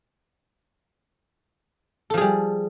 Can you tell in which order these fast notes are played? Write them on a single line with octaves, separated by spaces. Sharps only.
A4 F3 G#4 G3